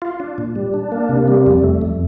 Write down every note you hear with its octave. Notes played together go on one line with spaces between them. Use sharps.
F4
D4
A#2
G3
D4
A#3
C3
G3
F2
A3
F2